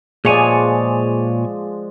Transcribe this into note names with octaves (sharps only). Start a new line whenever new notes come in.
A#2 F3 G#3 G#4 C#5 D5 G#5